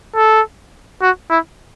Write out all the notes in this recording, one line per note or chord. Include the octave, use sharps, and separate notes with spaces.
A4
F#4
E4